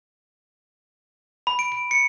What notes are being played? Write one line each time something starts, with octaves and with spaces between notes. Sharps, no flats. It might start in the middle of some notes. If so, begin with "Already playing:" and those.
B5
D7
D7
C#7